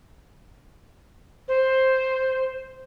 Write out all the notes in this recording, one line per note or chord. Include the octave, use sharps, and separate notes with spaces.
C5